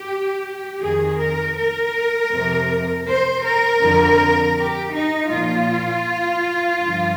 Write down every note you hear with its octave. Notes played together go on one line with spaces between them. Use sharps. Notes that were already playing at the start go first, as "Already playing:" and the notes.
Already playing: G4
F2 D#3 G#4
A#4
A#4
F2 C3 F3
C5
A#4
F2 D3 F3
G4
D#4
A#2 F3 F4
G2 D3 F3